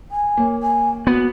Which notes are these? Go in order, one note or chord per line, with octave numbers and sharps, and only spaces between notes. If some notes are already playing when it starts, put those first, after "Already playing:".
G#5
A#3 C#5
G#5
B3 F#4